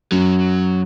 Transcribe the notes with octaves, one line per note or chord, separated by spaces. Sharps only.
F#2 F#3